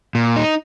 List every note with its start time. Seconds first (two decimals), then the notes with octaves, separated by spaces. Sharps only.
0.15 A#2
0.36 D#4